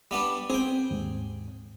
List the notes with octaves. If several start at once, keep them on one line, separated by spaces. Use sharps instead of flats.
G3 B3 D4
C4 G#4 G5
D#2 G#2